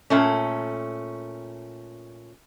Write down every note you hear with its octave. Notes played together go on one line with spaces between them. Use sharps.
A#2 A3 C#4